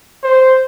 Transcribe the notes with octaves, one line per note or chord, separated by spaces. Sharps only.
C5